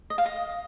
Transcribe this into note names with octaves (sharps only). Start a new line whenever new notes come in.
D#5
F5
D#5